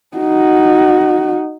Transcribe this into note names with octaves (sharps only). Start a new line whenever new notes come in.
D#4 F#4